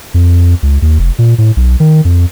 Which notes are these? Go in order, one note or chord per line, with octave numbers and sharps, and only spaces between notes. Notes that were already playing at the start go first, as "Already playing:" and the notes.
F2
C#2
D#2
F1
A#2
A2
B1
D#3
F2